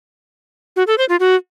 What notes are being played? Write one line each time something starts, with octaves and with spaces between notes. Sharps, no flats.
F#4
A4
C5
F4
F#4